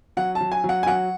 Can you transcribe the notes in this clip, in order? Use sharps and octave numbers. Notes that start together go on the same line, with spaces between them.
F#3 F#5
A5
F#3
G#5
F#3
F#5
G#5
F#3 F#5